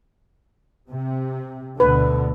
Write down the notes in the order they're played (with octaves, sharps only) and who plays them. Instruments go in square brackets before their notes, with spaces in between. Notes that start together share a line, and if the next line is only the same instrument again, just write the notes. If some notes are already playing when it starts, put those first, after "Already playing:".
[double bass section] C3
[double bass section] D2 B2 D3 [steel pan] B4